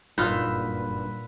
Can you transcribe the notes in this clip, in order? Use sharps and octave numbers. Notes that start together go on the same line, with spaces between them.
F#1 G2 A#2 D#4 F4 B4 F#5 E6